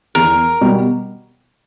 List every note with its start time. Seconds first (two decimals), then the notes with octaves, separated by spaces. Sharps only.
0.15 E2 A#4
0.61 B2 G3